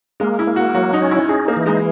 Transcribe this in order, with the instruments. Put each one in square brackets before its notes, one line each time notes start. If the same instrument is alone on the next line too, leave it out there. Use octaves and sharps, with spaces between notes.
[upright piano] G#3 [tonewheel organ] A#3
[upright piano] E4
[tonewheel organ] A#3
[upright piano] F#4
[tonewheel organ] F#3 [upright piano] F#4
[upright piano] D#4
[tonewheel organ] C#4
[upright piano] E4
[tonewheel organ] D#4 [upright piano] G#4
[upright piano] A#3
[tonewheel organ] E3
[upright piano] G#3